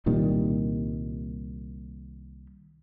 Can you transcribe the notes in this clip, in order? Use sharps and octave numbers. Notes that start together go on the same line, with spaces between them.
C2 A#2 D#3 G3